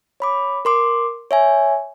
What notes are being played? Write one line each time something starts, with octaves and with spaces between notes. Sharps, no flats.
C#5 B5 D6
A#4 C6 D6
C#5 E5 G#5